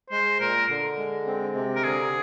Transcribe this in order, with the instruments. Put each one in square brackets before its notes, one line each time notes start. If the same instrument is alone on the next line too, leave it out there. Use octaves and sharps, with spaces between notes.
[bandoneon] G#3 [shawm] C5
[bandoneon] A#2 [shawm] A#4
[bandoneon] D3
G#3
C4
C3
[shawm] A#4
[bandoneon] D3 [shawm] G#4